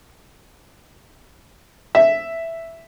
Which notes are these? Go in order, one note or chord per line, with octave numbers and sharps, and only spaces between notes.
E5